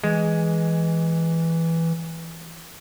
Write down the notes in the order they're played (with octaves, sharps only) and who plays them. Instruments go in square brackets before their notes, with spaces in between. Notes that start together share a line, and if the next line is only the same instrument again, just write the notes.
[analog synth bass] E3 [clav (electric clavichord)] G#3